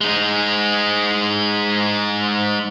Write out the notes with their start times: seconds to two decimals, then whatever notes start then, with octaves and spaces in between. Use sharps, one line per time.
0.01 G#3 D#4